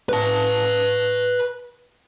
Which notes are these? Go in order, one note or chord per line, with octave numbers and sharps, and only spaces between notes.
B4 A5